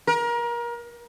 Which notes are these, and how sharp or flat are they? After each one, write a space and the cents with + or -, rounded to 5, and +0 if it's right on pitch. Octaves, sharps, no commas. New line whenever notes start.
A#4 +30